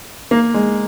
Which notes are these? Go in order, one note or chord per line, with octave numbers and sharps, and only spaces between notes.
A#3
G#3